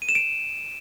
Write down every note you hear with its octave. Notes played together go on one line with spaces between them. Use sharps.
D#7
E7
D7